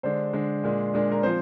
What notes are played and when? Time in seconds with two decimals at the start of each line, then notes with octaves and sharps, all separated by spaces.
0.03 D3 G#3 D4 C5
0.33 D3 G#3 D4
0.64 A#2 G#3 D4
0.93 A#2 G#3 D4
1.12 A#4
1.23 F3 C4 C5